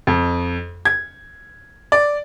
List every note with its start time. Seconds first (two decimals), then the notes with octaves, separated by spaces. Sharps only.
0.07 F2
0.85 G#6
1.92 D5